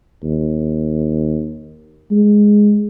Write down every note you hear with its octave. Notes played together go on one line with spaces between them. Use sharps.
D#2
G#3